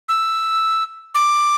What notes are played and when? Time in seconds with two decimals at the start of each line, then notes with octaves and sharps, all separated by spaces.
0.09 E6
1.15 D6